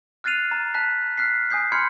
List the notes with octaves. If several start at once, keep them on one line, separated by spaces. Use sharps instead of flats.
F6 F#6 A6 C7 D#7 F7
A#5
A5 F#6 B6
F6 F#6 B6 C7
G#5 D#6 G6 C7
B5 C6 F6 G6 G#6 C#7